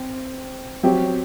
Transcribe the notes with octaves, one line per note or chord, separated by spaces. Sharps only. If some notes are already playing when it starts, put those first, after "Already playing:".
Already playing: C4
F#3 C4 G4